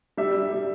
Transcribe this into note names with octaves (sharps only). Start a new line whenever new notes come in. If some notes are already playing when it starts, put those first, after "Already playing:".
G3 E5
G3
G3